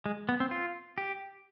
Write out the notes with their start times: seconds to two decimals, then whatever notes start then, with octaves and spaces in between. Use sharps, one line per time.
0.06 G#3
0.29 B3
0.40 C4
0.51 F4
0.98 G4